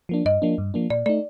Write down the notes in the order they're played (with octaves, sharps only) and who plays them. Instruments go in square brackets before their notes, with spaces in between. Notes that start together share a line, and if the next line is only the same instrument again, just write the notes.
[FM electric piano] F3 A#3 D4
[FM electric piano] G2 [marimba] D#5
[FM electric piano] F3 A#3 D4
G2
F3 A#3 D4
[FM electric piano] A#2 [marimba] D5
[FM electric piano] A3 D#4 [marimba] D5